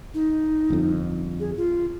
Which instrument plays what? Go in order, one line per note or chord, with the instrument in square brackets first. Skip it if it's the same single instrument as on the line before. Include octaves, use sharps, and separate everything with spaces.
[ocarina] D#4
[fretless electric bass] G1 F2
[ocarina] G#4
F4